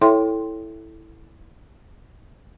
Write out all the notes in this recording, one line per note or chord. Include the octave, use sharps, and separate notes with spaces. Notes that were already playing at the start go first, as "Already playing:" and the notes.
E4 A4 C#5 E5 G5 C6